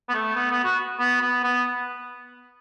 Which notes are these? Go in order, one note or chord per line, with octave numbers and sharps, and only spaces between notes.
B3
A3
B3
B3
F#4
B3
B3
B3